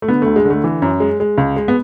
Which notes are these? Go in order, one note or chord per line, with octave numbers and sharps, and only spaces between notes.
A3
D3 B3
D2 A3
G#3
D3
A3
E3
F#2
G#3
G#3
C#2
G#3
B3